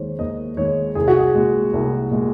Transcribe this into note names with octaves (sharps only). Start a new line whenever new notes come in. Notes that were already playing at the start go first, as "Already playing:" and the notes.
Already playing: D#2 D#3 G#3 C5 C#5
D#2 D#5
D#3 G#3 C#5
C2 G#4
F#4
G#4
A#2 G#3
C2
A#2 G#3